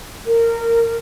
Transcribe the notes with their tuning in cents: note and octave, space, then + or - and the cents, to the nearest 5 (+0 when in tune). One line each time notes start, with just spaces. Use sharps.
A#4 -15